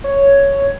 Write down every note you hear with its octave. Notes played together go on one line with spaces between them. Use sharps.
C#5